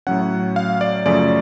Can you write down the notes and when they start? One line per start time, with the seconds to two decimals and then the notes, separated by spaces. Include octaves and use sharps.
0.07 A2 F#3 C#4 F#5
0.56 F5
0.81 D5
1.06 F#2 C#3 F3 A3 C#4 D5